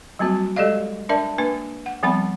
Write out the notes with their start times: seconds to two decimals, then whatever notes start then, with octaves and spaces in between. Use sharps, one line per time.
0.19 F#3 G3 A#3 C4 F#4
0.56 G#3 G4 A4 D5 D#5 F5
1.09 D4 A#4 D5 E5 A5
1.38 A#3 D4 B4
1.86 F#5
2.03 F3 G3 B3 C4 F#5 B5